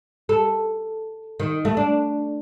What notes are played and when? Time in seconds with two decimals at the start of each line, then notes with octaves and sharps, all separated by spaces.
0.29 A4
1.40 D#3
1.65 A3
1.77 D4